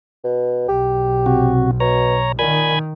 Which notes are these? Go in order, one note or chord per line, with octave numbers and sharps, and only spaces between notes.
B2
B1 G4
C3 F#4
B2 C#5 A#5
A#2 D#3 G#5 B5 G#6